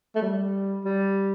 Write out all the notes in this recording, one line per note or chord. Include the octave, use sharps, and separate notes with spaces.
A3
G3
G3